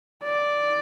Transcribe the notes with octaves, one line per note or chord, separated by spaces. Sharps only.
D5